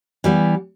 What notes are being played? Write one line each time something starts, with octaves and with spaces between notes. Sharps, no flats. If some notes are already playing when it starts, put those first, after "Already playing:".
E3 G3 B3